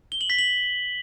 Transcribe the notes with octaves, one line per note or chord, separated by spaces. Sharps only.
G7
F#7
B6
F#7